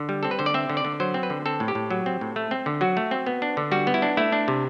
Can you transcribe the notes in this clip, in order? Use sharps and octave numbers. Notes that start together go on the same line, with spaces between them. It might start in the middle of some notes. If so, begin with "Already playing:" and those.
Already playing: D3
G3
C4 A4
B4
D3 C5
D5
C4 E5
D3
D5
D3
F#3 C5
C4
B4
D3
C4 A4
A2
G4
A2
F#3
C4
A2
A3
C4
D3
F#3 F#4
A3
C4
B3
D4
D3
G3 F#4
B3
E4
D4
A3 E4
D4
C3